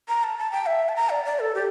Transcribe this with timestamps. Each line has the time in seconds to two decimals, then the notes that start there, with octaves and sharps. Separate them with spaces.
0.09 A#5
0.24 A5
0.38 A5
0.52 G5
0.66 E5
0.89 A5
0.96 A#5
1.10 D5
1.25 D5
1.40 A4
1.55 G4